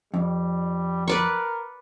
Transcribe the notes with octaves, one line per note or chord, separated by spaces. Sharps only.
F2 G3
A#4 B4 D5 C#6